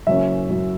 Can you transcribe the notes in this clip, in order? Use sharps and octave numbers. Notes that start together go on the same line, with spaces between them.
F#1 F#2 F#3 C#4 E5
F#1 F#2 F#3 C#4